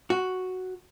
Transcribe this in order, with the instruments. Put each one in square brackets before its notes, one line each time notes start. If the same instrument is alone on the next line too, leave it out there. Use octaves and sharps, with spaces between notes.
[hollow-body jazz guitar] F#4